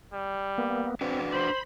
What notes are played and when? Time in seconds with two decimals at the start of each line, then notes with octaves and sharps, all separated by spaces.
0.13 G3
0.58 A#3 B3
1.01 C4 D4 F#4 B4
1.32 C5 B5